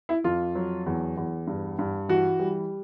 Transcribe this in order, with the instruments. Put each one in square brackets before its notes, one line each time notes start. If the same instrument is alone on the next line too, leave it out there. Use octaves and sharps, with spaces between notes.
[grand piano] E4
F2 F4
F#3
E2
E2
G2
G2
E3 F#4
G3